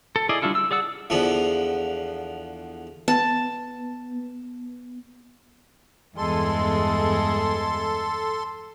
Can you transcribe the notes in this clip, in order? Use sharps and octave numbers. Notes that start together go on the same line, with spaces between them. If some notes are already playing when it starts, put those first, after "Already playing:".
A4
E4 G#4 D5 D#5
G3 D4 E4 F4 A4
E6
G#4 D5 F#5 E6
E2 D3 F3 B3
B3 A5
E2 G2 G#3 A4 C6